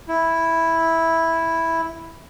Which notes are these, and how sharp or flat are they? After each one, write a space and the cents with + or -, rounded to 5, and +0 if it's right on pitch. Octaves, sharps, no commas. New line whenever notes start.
E4 -5